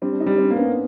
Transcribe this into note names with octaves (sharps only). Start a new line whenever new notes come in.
G3 C4 D4
D4
C#4 D#4
G3
C4 D4
A#3
B3 C#4